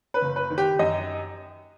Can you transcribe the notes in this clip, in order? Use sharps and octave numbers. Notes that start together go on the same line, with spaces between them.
B4
F#1
B4
D#3
G4
F#2 D#5